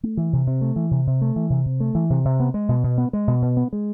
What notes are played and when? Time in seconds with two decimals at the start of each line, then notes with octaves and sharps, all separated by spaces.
0.03 A3
0.17 E3
0.33 C3
0.47 C3
0.61 A3
0.76 E3
0.91 C3
1.07 C3
1.22 A3
1.36 E3
1.50 C3
1.66 C3
1.80 A3
1.95 E3
2.10 C3
2.25 C3
2.40 B3
2.54 G#3
2.69 B2
2.84 B2
2.98 B3
3.13 G#3
3.28 B2
3.42 B2
3.57 B3
3.73 G#3